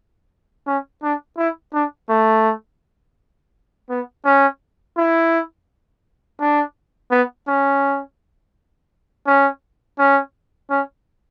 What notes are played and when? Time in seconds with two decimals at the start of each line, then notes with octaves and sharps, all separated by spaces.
0.67 C#4
1.03 D4
1.38 E4
1.74 D4
2.09 A3
3.90 B3
4.25 C#4
4.97 E4
6.40 D4
7.11 B3
7.47 C#4
9.26 C#4
9.98 C#4
10.70 C#4